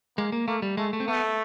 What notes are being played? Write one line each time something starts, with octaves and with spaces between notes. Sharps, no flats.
G#3 A#3
A#3
A3 A#3
G3
G#3 A3
A3
C4
A3 B3